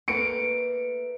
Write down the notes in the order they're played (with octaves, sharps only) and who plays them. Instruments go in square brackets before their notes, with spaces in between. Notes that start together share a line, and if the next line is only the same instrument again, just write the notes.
[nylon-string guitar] A3 A#3 B4 [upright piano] C#7 D7